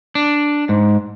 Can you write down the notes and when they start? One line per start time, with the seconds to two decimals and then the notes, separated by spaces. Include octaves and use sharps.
0.15 D4
0.69 G#2